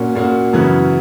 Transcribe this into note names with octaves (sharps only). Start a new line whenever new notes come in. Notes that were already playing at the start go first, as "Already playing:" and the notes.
Already playing: A#2 A#3 C#4 F#4
A#2 A#3 C#4 F#4
F#2 C#3 E3 B3 F#4